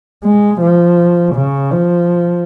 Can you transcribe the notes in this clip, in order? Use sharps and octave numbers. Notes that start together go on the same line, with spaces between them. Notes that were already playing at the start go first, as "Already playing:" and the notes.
G#3
F3
C#3
F3